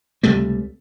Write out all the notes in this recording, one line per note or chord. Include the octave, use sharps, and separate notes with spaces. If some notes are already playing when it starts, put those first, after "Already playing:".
C#2 C3 G3 A3